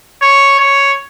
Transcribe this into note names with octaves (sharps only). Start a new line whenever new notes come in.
C#5
C#5